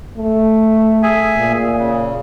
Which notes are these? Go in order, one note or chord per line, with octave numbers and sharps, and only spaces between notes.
A3
G#4 E5 G#5
A#2
C#3